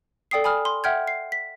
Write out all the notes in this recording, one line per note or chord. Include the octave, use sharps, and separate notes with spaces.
A4 D5 G5 D#6 C7
G#5 B5 D#6 F6
C6
E5 F#5 G5 F6 G6 G#6
C7
B6